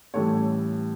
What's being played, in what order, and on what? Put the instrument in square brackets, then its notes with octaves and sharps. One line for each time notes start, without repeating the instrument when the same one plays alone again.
[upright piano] A1 A2 E3 G3 A4 C#5